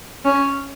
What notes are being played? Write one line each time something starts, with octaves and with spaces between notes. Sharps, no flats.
C#4